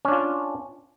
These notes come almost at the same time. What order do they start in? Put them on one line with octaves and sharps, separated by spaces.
C#4 D4 F4